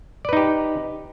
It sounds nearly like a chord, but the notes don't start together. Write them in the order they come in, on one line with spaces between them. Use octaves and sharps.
D5 B4 D#4 G4